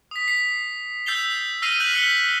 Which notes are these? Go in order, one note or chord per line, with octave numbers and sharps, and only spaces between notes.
D#6 B6
C7
E6 G6 A6 C7 F7 G7
E6 F6 A#6 C7 D#7 F7
F#6 G6 B6 F#7
F6 G6 B6 C#7 G7